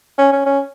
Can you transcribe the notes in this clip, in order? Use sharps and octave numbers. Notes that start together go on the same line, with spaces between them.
C#4
C#4
C#4